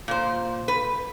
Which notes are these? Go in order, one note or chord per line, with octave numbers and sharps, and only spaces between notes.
A#2 C5
B4